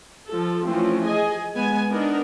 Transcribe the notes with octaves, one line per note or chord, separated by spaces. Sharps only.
F3 A4
E3 F3 A3 C4 C#4 F4
G#4 D#5 G#5
G#3 B3 G#5
B3 D4 D#4 A#4